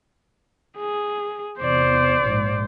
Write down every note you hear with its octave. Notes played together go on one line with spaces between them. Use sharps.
G#4
E2 C3 C5 D5
A#1 G#2